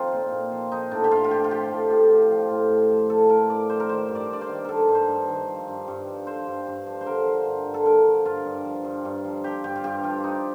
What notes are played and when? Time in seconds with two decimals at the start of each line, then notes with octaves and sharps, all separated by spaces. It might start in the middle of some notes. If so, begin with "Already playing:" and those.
Already playing: F3 C4 D#4 F4
0.12 A#2
0.32 A#2
0.52 F3
0.72 F3 D#4
0.92 A2 D4
1.04 G4
1.11 A2 F4
1.24 F4
1.31 F3 G4
1.44 F4
1.51 F3 G4
1.71 A2
1.90 A2
2.11 F3
2.30 F3
2.50 A2
2.69 A2
2.90 F3
3.10 F3 A4
3.29 A2 A#4
3.49 A2 D5
3.69 F3 C5
3.80 A#4
3.89 D#3 C5
4.09 G2
4.15 D5
4.28 G2 D5
4.41 C5
4.49 D#3
4.65 D#3 A4 A#4
4.88 G2
4.95 C5
5.08 G2
5.28 D#3
5.48 F3
5.68 G2
5.88 G2
6.07 F3
6.27 F3 C5
6.47 G2
6.67 G2
6.86 F3
7.01 C5
7.06 D3 A#4
7.26 F3
7.46 G2
7.66 G2
7.74 A4
7.85 D3 A#4
8.05 F3
8.25 G2 F4
8.45 G2
8.65 F3
8.84 G2
9.05 G2
9.24 F3
9.44 F3 G4
9.64 G2 G4
9.76 F4
9.84 G2 G4
10.03 F3 F4
10.24 F3 D#4